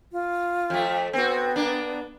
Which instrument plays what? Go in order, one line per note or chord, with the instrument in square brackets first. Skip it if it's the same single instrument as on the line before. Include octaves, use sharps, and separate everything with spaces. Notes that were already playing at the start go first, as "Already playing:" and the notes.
[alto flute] F4
[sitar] F2 A3
[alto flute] B3 [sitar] C4 F#4
[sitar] A#3 D4